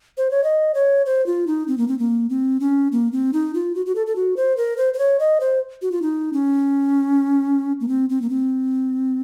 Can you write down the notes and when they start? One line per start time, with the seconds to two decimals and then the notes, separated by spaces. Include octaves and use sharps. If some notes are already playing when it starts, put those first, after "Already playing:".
0.17 C5
0.31 C#5
0.44 D#5
0.74 C#5
1.06 C5
1.26 F4
1.47 D#4
1.68 C4
1.78 A#3
1.88 C4
1.99 A#3
2.30 C4
2.60 C#4
2.92 A#3
3.12 C4
3.33 D#4
3.54 F4
3.75 F#4
3.86 F#4
3.95 A4
4.07 A4
4.16 F#4
4.37 C5
4.57 A#4
4.78 C5
4.94 C5
4.98 C#5
5.20 D#5
5.40 C5
5.82 F#4
5.92 F4
6.02 D#4
6.33 C#4
7.80 A#3
7.88 C4
8.09 C4
8.22 A#3
8.30 C4